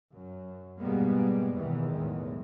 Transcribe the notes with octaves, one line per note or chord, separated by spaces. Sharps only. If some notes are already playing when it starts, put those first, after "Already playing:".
F#2
G#2 B2 G3 G#3 A#3 B3
E2 G#2 B2 D#3 E3
B1 E2 A2 G#3